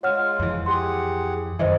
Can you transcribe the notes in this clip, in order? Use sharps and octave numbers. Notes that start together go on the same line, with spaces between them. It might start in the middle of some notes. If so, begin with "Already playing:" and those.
G#3 F4 C#5 F#5 F6
F2 E3
G4 G#4 F#5 C6
F#2 D#3 E3 C5 D#5 E5